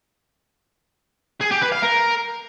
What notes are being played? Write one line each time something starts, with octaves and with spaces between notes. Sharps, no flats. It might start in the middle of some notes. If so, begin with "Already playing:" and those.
G#4
G4
B4
F5
A#4